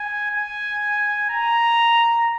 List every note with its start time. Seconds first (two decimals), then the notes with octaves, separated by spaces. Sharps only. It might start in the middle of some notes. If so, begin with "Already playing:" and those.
Already playing: G#5
0.31 G#5
1.30 A#5